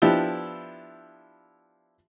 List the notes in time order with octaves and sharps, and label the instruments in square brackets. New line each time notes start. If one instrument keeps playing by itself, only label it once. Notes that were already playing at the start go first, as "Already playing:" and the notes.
[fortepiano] F3 B3 D4 E4 G4